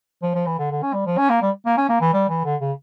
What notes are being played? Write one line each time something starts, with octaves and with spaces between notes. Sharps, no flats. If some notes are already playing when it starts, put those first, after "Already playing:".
F3
F3
E3
D3
D3
C#4
G3
F3
C#4
A#3
G3
A#3
C#4
A#3
E3
G3
E3
D3
C#3